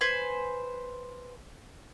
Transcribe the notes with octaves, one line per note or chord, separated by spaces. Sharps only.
B4 C5 G#5